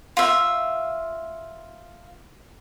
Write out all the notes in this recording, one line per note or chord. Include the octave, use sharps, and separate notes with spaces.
F4 E5